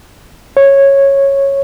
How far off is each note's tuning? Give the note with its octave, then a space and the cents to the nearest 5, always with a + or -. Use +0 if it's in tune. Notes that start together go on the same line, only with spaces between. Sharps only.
C#5 -10